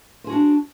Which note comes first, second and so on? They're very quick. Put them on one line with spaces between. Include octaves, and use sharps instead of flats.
C5 G#4 F#4 D4